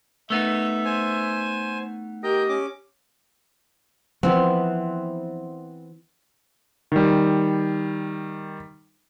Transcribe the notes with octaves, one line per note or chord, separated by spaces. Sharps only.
A3 B3 D#4 E5 E6
C5 G#5
G4 A#4 D#5 G5
C#4 D6
E3 F3 B3 C4
D#3 G3